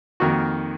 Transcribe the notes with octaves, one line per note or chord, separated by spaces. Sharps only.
F2 D#3 A#3 D#4 F#4